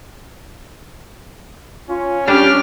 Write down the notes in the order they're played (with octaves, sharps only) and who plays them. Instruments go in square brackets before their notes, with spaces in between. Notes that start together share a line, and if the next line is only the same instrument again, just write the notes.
[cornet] C#4 [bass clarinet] F4
[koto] G3 D4 [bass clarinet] C#4 [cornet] G4 [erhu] F6